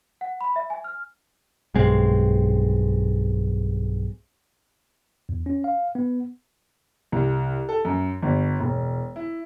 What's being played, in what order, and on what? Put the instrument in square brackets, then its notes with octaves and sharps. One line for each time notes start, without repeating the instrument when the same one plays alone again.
[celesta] F#5
B5
E5
G#5
F6
[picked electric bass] B1 G2 G#3 C4
[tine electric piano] E2
C#4
F5
B3
[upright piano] C2
A4
F#2
G1
E1
E4